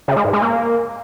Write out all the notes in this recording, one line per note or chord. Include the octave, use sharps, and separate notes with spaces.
C#3
G#3
G#2
G#3
A#3